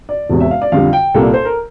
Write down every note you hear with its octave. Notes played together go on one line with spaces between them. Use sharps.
D5
E1 E2 C3
E5
F5
D5
F2 D3 G3 F5
G5
C2 A#2 G3 A#3 A4
C5
A#4